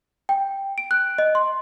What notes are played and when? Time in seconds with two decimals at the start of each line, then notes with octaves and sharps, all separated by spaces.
0.29 G5
0.78 D7
0.91 F#6
1.18 D#5
1.35 C6